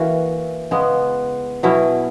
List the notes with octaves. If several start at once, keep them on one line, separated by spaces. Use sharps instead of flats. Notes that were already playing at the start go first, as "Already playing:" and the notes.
Already playing: E3 A#3 C#4 F#4
C#3 G#3 B3
B2 F#3 C#4 E4